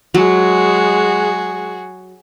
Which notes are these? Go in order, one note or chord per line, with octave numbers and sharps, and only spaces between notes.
F#3 G#3 F#4 G#4